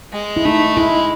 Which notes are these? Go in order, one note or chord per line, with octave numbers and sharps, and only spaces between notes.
G#3
E4
A3 D#4
G#3 E4